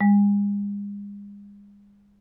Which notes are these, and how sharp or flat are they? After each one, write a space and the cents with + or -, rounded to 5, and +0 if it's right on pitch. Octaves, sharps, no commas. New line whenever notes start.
G#3 -45